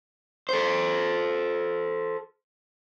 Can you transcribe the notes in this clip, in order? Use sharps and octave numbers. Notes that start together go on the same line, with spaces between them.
A4 C5